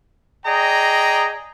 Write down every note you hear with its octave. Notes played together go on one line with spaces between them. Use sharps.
G#4 D5 D#5 G5 A#5